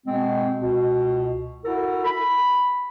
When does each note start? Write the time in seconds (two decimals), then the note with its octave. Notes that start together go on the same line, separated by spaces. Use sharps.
0.05 B2 G#3 C4
0.61 C#2 B2
1.64 E4 F#4 A4 A#4
2.05 B5